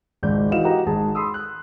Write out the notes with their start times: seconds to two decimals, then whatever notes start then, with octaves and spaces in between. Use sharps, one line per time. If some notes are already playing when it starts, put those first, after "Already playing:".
0.23 G#1 C#2 G#2 D5 G6
0.51 E3 E4 F#4 D#5 F5 E7
0.64 F#4 G4 A#4 D#5 A#5
0.86 G#1 G#4 A5
1.15 B5 C6 D#6 E6
1.34 F#6